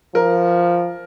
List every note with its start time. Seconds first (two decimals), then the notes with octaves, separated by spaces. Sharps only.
0.15 F3 A#4